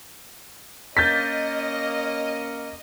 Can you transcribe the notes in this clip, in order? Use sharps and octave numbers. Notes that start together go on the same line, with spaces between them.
A#3 C#4 D#5 G6 A6 B6